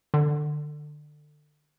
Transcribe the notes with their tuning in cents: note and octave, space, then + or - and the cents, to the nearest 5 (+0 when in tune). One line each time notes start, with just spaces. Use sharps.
D3 +25